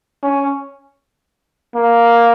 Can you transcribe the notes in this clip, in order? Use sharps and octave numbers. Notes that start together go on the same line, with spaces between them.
C#4
A#3